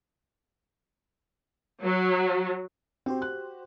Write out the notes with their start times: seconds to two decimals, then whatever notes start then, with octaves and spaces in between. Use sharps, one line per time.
1.82 F#3
3.06 C4 F#4 G4 C5
3.22 F#6